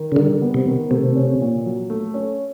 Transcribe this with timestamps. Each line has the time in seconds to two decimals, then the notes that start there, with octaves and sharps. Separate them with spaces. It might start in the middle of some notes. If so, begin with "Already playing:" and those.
Already playing: D#3
0.12 C#3
0.16 D3 G3
0.42 B3
0.54 C3
0.67 D#3
0.91 C3 A3
1.16 C#4
1.41 A#2
1.65 F#3
1.90 A3
2.14 C#4